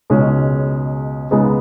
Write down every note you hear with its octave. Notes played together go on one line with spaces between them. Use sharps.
C#2 B2 G#3 C#4
C#2 C#3 G#3 B3 D#4